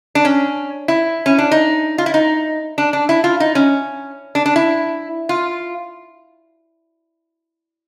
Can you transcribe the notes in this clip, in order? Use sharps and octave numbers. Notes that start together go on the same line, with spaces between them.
D4
C#4
E4
C#4
D4
D#4
F4
E4
D#4
D4
D4
E4
F4
D#4
C#4
D4
D4
E4
F4